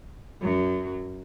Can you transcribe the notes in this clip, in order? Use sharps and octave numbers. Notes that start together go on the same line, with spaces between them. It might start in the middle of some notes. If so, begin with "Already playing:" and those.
F#2 F#3